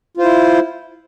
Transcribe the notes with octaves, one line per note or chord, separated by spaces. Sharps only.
E4 F4 C5